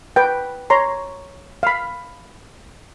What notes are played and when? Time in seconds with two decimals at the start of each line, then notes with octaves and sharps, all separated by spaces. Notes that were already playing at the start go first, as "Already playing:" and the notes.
0.16 B4 G5
0.70 C#5 A#5 C6
1.63 F5 B5